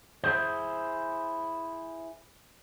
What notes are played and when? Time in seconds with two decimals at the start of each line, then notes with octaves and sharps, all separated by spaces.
0.24 E4 G#4 C5